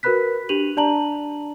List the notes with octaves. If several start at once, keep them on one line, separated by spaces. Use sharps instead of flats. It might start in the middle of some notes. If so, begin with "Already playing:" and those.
F#4 A#4 B4 B5 F#6 B6
D4 G4 D#7 F7 F#7
D4 D5 A5 A#5 F#7